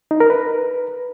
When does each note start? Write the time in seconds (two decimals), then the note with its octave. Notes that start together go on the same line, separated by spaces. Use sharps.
0.11 D#4
0.20 A#4
0.30 B4